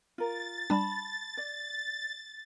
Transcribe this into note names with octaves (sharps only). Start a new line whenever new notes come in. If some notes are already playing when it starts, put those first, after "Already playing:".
F4 A#4 A6
G3 D4 A5 B5
D5